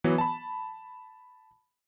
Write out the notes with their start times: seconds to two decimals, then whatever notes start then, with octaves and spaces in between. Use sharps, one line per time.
0.04 E3 F#3 B3
0.18 A5 B5